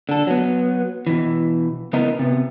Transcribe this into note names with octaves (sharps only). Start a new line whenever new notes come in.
D3 A4
F#3 B3
B2 E3
C#3 B3 E4 A#4 D#5
C3 B3